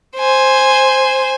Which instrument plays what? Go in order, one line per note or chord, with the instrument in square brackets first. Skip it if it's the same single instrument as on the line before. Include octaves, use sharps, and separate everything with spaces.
[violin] C5 G#5